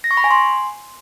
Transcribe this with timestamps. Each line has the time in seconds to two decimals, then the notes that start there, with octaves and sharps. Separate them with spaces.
0.04 A#6
0.11 C#6
0.17 B5
0.24 G#5
0.31 C6